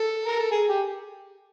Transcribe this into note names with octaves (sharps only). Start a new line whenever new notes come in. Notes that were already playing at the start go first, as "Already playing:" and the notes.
Already playing: A4
A#4
A4
G#4
G4